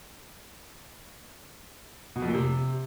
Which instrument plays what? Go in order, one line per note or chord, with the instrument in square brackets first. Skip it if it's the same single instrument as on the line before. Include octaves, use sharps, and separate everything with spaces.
[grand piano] B2
F2
A#2
C3